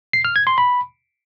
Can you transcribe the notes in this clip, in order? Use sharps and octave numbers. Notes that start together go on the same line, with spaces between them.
C7
F6
G#6
C6
B5